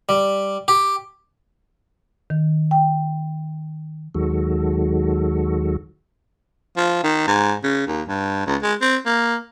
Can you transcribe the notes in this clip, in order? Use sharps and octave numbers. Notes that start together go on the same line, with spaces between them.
G3
G4
D#3
G5
D#2 D#3 F#3 G#3 F#4 A4
F3
D#3
G#2
C#3
D#2
G2
C#2
G#3
C4
A#3